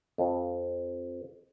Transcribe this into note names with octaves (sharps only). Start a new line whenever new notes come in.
F2